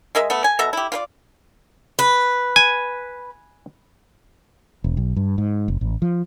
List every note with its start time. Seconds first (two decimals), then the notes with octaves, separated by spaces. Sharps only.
0.15 G#3 A#4 D#5 E5
0.30 A3 B3
0.44 G#5
0.59 B2 A4 E5 A#5
0.73 E4 G4
0.92 F4 B4 D5
1.99 B4
2.56 G#5
4.84 E1
4.97 B1
5.16 G2
5.38 G#2
5.68 F#1
5.81 A1
6.02 F3